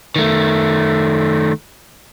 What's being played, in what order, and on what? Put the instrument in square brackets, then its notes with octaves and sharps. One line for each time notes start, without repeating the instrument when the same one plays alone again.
[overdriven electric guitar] D#3 A3